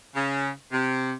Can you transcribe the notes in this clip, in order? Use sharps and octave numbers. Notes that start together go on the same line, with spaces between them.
C#3
C3